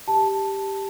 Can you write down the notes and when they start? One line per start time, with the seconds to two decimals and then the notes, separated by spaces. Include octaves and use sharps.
0.08 G4 A5